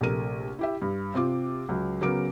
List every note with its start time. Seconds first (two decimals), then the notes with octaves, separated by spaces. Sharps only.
0.01 A#1 C3 A3 A#4 D#7
0.59 E4 G4 E5
0.82 G2
1.14 C3 C4 F4 D6
1.69 C#2 F#3
2.01 C#3 F#3 B3 A#4 D6 D7